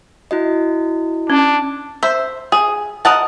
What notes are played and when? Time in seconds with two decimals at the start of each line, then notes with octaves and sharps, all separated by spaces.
0.31 E4 F#4 D#5
1.30 C#4 D4
2.03 C5 E5
2.52 G#4
3.05 A#4 D#5 F#5 A5